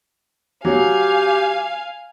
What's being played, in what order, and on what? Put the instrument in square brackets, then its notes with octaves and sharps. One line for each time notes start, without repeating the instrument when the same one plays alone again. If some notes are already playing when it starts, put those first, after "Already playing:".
[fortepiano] F#3 [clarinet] G4 [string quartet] F5 G#5